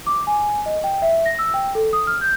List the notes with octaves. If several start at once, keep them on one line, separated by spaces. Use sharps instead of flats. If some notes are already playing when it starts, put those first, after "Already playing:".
D6
G#5
D#5
G5
E5
A#6
E6
G5
A4
D#6
F6
G6